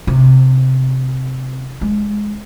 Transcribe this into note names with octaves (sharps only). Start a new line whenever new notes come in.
C3
G#3